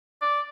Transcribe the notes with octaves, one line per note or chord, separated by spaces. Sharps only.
D5